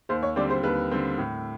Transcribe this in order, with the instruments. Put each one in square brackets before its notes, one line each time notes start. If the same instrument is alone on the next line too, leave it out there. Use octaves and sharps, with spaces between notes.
[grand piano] D#2 [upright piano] C5
[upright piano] C#5
[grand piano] D3 G3 C4 [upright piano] D5
[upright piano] C5
[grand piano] D#2 [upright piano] B4
[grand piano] D3 G3 C4
A2